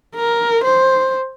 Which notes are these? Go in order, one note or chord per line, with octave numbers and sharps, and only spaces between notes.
A#4
C5